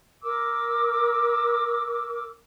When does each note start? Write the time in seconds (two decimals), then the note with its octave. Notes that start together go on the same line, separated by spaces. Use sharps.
0.22 A#4 D6 E6